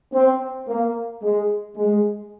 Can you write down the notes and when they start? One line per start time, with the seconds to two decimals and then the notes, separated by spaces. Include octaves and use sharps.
0.14 C4
0.68 A#3
1.23 G#3
1.76 G#3